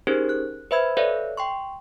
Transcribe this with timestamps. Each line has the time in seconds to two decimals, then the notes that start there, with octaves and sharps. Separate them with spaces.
0.07 C#4 D#4 G4 G#4 A#4 C5
0.29 F#6
0.71 B4 C5 E5 B5 E6 G#6
0.97 A4 B4 C#5 D5 E5 F5
1.37 G5 C6 C#6